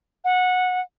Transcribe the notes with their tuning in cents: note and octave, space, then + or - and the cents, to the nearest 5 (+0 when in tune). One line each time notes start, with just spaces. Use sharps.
F#5 -20